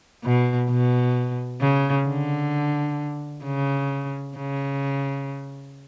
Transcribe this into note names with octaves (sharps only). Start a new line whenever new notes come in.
B2
B2
C#3
D3
C#3
C#3